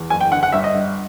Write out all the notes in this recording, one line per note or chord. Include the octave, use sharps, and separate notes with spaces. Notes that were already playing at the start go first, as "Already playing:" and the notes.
Already playing: E2
F#1 G#5
G5
D3 F#5
F#5
G1 E5
D#5
G2